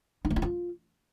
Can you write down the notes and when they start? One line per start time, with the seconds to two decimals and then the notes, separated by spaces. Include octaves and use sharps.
0.25 D#4
0.30 A3
0.36 E4
0.42 F4